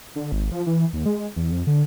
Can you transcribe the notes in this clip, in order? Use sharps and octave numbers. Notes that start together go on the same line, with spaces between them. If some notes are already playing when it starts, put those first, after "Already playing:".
D3
G#1
F3
E3
D#2
G#3
E2
F2
D3